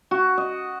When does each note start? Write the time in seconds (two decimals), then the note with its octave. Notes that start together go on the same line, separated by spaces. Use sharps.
0.11 F#4
0.38 D#5